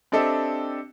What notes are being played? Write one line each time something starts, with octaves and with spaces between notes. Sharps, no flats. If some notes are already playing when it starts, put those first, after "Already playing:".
C4 D4 G4 A4 D#5 E5